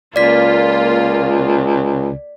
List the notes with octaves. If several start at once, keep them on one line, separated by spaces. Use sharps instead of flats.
C#2 A#3 F4 D5 B6